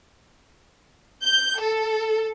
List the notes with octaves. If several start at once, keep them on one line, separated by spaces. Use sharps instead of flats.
G6
A4